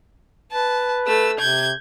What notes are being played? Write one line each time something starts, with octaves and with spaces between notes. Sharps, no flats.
B4 A5
A3 E6
C3 G6 G#6